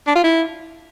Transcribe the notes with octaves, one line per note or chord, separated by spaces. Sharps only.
D4
F4
E4